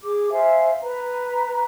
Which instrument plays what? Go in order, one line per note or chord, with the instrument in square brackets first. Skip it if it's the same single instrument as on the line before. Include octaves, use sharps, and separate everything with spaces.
[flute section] G#4 D6
C5 E5 F5 G#5
B4 A#5